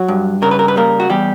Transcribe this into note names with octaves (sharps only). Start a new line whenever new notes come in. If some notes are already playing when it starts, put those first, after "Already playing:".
Already playing: F#3 F#4
G2
C#3 A#4
B4
A#4
B4
G3 A#3 A#4
F#4
E2 G3 G4